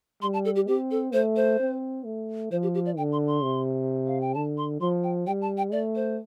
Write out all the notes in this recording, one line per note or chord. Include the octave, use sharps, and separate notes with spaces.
G3 C6
A5
A4
G4
C4 G4
A4
A3 C5
C5
C4
A3
F3 C5
G4
G4
D5
D3 G5
C6
C6
C3
F5
G5
D3 A5
C6
F3 C6
G5
G3 G5
A5
G5
A3 D5
C5